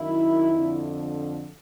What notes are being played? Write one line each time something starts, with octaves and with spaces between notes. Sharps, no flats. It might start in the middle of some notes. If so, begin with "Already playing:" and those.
Already playing: F#2 D#3 E4
F2 D3